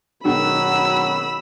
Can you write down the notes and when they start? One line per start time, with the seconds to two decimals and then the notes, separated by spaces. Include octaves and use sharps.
0.25 B2 D#3 F#3 G#3 B5 E6